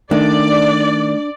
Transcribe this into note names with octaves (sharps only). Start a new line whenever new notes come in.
D#3 A3 D4 D5